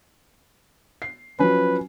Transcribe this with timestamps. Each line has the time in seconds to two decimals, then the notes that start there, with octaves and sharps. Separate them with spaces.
1.02 C7
1.39 F3 F#3 C#4 B4